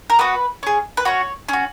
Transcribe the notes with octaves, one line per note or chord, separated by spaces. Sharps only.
A#4
B3 F#4 B4
C#4 G#4
B4
C#4 F#4 C#5
C#4 F#4